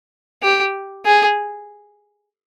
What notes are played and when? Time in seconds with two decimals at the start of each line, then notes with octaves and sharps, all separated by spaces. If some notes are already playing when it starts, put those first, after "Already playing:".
0.43 G4
1.06 G#4